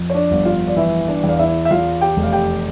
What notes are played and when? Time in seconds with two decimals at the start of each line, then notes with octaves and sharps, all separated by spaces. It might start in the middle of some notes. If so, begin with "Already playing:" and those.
Already playing: F2
0.10 C#5
0.14 D4 D5
0.31 G1
0.45 F4 F5
0.67 D5
0.76 E3 E4 E5
1.08 D4 D5
1.24 E2
1.29 F5
1.39 E4 E5
1.65 E5
1.71 E2 F4 F5
2.01 G4 G5
2.17 F1
2.23 F5
2.32 G4 G5